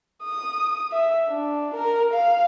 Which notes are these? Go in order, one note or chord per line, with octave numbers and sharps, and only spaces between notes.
D#6
E5
D4
A#4
F5